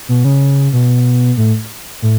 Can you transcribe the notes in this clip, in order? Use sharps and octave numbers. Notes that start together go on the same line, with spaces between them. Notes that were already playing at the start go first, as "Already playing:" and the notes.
B2
C#3
B2
A2
A2